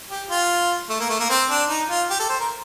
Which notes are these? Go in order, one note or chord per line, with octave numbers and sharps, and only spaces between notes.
G4
F4
A3
A#3
A3
A#3
C4
D4
D#4
F4
G4
A4
C5
A#4